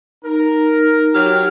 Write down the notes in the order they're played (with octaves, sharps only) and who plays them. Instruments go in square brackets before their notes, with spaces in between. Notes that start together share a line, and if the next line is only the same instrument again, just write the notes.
[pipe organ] D#4 [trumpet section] A#4
[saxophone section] F#3 G4 [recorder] F6